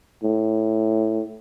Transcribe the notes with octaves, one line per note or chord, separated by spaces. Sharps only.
A2